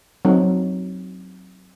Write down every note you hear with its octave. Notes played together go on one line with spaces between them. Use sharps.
F#3 C4 D#4